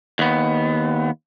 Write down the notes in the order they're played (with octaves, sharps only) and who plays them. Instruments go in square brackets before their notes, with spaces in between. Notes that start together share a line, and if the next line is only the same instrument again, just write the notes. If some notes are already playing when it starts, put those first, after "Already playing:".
[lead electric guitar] D#2 B3